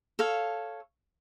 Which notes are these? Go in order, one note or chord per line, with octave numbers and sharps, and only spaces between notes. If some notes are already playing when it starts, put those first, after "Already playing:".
A4 C#5 F5